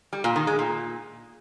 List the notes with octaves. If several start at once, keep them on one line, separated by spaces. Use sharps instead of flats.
G3
A#2
D#3
G#3
A#2